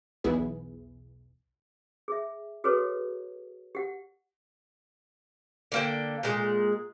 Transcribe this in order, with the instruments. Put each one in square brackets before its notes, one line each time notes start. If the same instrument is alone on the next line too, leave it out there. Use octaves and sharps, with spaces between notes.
[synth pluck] B1 E2 B3 E4 G#4 B4
[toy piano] G#4 E5
F#4 G#4 A4 B4 C#5
G4 F#5
[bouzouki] D3 A#3 G5
A#2 G#3